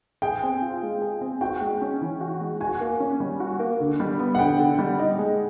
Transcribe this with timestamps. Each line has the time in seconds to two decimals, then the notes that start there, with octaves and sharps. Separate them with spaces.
0.22 G#4 G5
0.43 C4
0.62 F4
0.83 G#3
1.01 G#4
1.21 C4
1.41 F#4 G5
1.61 G#3
1.81 C#4
2.01 E3
2.21 F#4
2.40 G#3
2.60 F#4 G#5
2.80 A#3
3.00 C#4
3.20 G3
3.40 F#4
3.59 A#3
3.80 D3
4.00 G3
4.19 B3
4.35 F#5
4.39 D3 G5
4.59 D3
4.79 G3
4.99 D#4
5.19 G#3